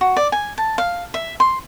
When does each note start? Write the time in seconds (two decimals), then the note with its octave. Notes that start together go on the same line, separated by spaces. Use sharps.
0.01 F#4
0.16 D5
0.32 G#5
0.58 A5
0.78 F5
1.14 E5
1.40 C6